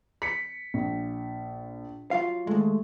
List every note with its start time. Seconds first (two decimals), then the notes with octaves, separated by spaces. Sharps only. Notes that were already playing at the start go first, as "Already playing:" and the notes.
0.22 B6 C#7
0.74 A#1
2.11 F#3 F4 F5
2.47 D#2 G#3 A3